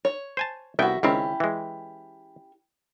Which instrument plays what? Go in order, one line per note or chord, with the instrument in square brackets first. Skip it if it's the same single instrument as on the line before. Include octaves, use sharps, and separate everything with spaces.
[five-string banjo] C#5
[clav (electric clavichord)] C5 G#5 A5
[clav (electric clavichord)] C2 B3 G5 [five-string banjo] F#4 E5
[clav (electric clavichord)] C#2 D#3 C4 [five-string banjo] C#4 E4 G4
[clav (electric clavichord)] E3 G#3